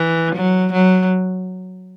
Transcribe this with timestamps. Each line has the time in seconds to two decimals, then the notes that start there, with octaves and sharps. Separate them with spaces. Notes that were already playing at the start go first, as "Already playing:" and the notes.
Already playing: E3
0.35 F#3
0.73 F#3